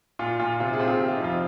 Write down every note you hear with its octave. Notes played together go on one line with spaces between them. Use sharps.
A#2 F4
A#2 F4
C3 F4
F4 G#4
C4
F4 G#4
C3 G4
F4
D#4
F2 F4